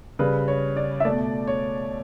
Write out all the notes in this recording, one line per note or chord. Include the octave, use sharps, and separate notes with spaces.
C#3 G3 B4
C#5
D5
E5
B2 A3 D5
C#5